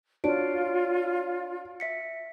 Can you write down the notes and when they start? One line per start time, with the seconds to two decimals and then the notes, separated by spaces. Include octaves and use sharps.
0.24 D4 F4 F#4 C#5 D7
1.80 E5 B6 C#7